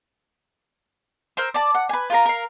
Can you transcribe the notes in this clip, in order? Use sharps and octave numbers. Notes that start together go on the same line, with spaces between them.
A#4 C5 E6
D5 A5
F#5
B4 G#5
F4 A#4 A#5
A#4 F5